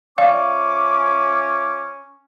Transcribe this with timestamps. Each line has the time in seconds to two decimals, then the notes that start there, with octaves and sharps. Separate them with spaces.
0.18 F3 C#4 D5 E5 F5 D6